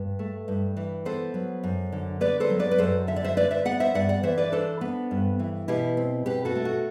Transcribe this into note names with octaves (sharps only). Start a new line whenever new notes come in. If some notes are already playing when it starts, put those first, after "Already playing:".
Already playing: G2
A3
G2
E3
B3 A4 C5
F#3
F#2
D3
B3 B4 D5
A4 C5
F#3
B4 D5
B4
F#2 A4 C5
D3 E5
D5
C5 E5
D4 B4 D5
C5 E5
B3 D5 F#5
C5 E5
G2 D5 F#5
D5 F#5
E3 C5 E5
B4 D5
D4 A4 C5
B3
G2
E3
B2 E4 G4
C4
B2 G4 B4
F#4 A4
A3
F#4